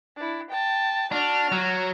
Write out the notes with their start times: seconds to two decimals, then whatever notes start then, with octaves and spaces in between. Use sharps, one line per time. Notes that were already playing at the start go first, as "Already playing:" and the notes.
0.16 D4 E4
0.50 G5 A5
1.12 D4 F#4 F6
1.52 F#3